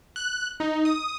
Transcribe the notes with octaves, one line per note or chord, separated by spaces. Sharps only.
F#6
D#4
D#6